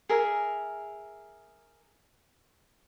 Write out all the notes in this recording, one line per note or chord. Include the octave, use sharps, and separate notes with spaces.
G#4 A#4 E5